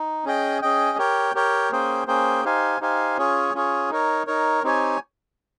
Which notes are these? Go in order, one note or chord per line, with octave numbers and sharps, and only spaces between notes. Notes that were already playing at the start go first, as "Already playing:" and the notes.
Already playing: D#4
C#4 G#4 D#5 G5
C#4 G#4 D#5 G5
G4 A#4 C#5 G5
G4 A#4 C#5 G5
A#3 C#4 G#4 C5 G5
A#3 C#4 G#4 C5 G5
D#4 G4 C5 F5 G#5
D#4 G4 C5 F5 G#5
C#4 F4 G#4 C#5
C#4 F4 G#4 C#5
D#4 A#4 C#5
D#4 A#4 C#5
C4 D#4 G4 C#5 G#5